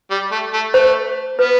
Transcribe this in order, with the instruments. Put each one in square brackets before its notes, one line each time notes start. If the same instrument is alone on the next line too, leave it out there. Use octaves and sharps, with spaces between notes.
[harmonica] G3
A3
A3
[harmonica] A3 [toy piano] C5
[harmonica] B3 [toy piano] B4